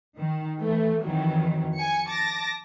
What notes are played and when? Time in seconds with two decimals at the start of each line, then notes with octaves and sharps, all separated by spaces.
0.17 D#3
0.58 E3 A3
1.03 F2 D#3 E3 F#3
1.75 G#5 C#7
2.07 A5 D6 A6 A#6